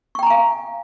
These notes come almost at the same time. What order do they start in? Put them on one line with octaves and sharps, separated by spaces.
C#6 G5 A#5 G#5 F5